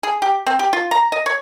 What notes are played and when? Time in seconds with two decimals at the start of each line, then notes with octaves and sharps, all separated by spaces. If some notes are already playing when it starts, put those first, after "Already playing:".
0.03 G#4
0.22 G4
0.46 C4
0.59 G4
0.73 F4
0.91 A#5
1.12 D#5
1.26 C#5